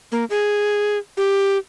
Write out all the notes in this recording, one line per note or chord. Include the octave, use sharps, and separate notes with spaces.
A#3
G#4
G4